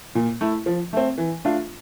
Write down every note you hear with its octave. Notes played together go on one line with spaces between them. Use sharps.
A#2
A3 E4
F3
A3 C4
E3
A3 D4 F4